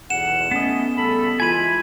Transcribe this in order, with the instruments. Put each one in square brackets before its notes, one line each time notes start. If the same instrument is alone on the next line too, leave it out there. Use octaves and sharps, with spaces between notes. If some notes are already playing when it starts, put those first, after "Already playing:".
[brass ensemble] B1 E2 [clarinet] F#5 [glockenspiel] E7
[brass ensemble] A3 [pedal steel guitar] B3 D#5 [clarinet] C#4
[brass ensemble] C#3 G3 A4 [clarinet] B5
[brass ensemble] E3 G#3 [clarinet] F4 [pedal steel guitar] G#5 B5 [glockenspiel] G#6 D#7